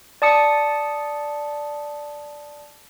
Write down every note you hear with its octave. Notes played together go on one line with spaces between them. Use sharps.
D5 A5 D#6 C#7